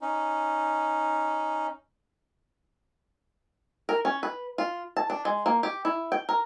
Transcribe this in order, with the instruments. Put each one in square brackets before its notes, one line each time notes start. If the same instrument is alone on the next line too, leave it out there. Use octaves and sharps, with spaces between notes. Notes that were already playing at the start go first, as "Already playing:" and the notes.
[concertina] C#4 D#4
[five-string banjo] A#4
C#4
B4
F4
A5
D4
G#3
A#3
G4
E4
G5
A#4